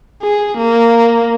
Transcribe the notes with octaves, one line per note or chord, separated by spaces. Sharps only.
G#4
A#3